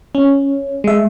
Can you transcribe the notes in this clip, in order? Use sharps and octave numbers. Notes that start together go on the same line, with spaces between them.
C#4
G#3 E5